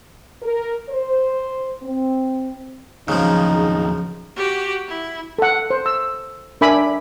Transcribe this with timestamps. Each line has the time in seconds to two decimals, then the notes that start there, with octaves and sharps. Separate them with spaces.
0.42 A#4
0.90 C5
1.82 C4
3.08 D#2 C#3 F3 F#3 D#4 G#4
4.37 F#4 G4
4.88 E4
5.38 A4 F#5
5.70 C5
5.86 E6
6.61 D4 A#4 E5 G#5 B5 D6